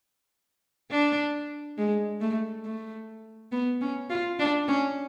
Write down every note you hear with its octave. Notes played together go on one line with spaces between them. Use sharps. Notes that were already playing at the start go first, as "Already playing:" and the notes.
D4
G#3
A3
A3
B3
C#4
F4
D4
C#4